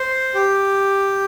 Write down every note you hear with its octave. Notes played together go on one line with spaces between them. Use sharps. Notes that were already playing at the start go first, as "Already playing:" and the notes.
Already playing: C5
G4